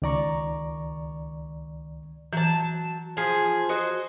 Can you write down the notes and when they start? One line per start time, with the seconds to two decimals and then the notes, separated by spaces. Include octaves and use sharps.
0.02 C#2 D#3 D5 A#5 C#6
2.33 E3 F#3 A5
3.17 F3 G#4
3.69 F#4 C5 D#5